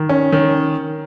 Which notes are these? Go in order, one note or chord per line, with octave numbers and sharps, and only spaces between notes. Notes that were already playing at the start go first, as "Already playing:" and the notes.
Already playing: D#3
C#4
D#3